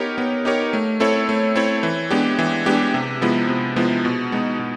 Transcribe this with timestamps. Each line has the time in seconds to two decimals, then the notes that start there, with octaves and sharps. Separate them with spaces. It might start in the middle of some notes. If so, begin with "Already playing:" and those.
Already playing: B3 D#4 G4 A#4 C#5
0.18 B3
0.45 D#4 G4 A#4 C#5
0.73 A3
1.00 C4 E4 A4 C#5
1.29 A3
1.56 C4 E4 A4 C#5
1.83 E3
2.11 G#3 B3 D4 G4
2.39 E3
2.66 G#3 B3 D4 G4
2.94 C3
3.21 F3 G#3 B3 E4
3.48 C3
3.76 F3 G#3 B3 E4
4.05 B2
4.32 G#3 B3 D#4
4.59 B2